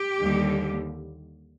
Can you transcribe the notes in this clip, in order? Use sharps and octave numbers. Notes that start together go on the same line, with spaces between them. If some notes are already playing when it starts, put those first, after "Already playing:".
Already playing: G4
D#2 D3 G3